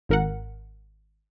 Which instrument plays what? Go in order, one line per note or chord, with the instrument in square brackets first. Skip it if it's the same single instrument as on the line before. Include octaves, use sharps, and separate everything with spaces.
[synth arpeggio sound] G#1 A#4 F#5